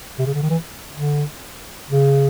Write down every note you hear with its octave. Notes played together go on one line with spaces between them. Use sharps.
C3
C#3
D3
D#3
E3
D3
C#3